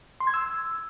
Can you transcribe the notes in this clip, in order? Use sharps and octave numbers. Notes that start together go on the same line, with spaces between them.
C6
G#6
E6